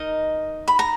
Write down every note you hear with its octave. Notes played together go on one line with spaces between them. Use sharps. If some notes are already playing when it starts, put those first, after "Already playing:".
Already playing: D#4 A#4 D#5
B5
A#5